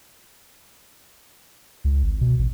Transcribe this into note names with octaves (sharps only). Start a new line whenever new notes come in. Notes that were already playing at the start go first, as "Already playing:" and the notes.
C#2
G#1
B2
A1